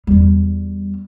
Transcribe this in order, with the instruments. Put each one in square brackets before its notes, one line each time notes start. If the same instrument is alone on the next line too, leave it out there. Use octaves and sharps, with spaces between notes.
[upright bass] E2 G3